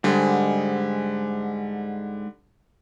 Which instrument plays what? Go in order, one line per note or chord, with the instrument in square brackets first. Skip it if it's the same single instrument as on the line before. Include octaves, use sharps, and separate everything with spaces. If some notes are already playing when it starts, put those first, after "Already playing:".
[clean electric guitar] G#2 [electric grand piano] D3 G3